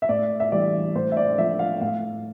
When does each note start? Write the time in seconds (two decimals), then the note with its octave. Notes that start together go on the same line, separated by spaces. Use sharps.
0.02 E5
0.09 A2 D5
0.40 E5
0.52 E3 G3 D5
0.95 A2 C5
1.12 E5
1.17 D5
1.38 F3 E5
1.59 F5
1.81 A2 F5